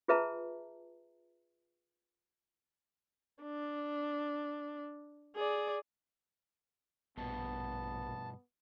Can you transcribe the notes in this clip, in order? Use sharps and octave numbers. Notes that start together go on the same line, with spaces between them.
F4 G#4 B4 E5 A5 A#5
D4
G#4 D5
A#1 G2 B2 B3 A5